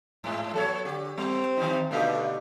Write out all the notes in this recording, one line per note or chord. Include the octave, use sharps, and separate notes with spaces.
G#2 G#3
F#3 B3 A4 C#5
D3 G4
G3 C4
D#3 G3 D#4
B2 D3 A3 D#4 G4